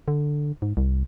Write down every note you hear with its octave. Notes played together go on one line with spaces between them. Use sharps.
D3
G#2
C2